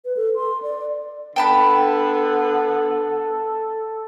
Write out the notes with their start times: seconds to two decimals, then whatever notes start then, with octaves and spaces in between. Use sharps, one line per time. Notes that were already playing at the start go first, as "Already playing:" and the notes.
0.05 B4
0.17 A4
0.36 C6
0.62 D5
1.36 D3 B3 A4 G5 A5 B5